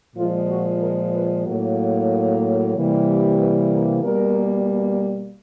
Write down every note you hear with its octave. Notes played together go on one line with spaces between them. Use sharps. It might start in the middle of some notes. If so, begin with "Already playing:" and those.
A#2 F3 G#3 F4
F#4
A#4
B4
A2 F#3 A#3
C3 E3 G3 A#3
B4
A#4
B2 G3 A#3 A#4